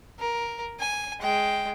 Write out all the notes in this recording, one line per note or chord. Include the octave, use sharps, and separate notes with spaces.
A#4
G#5
G#3 G5